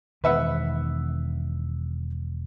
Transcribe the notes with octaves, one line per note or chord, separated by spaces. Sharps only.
E1 D#3 B3 B4 E5 F#5